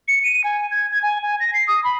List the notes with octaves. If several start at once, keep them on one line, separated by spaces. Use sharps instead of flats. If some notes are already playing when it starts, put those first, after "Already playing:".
C#7
D#7
G#5
G#6
G#6
G#5
G#5
A#6
C7
D#6
B5